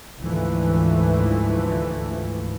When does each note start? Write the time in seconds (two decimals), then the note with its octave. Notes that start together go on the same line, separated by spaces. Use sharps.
0.19 D2 G#2 E3 F3 A3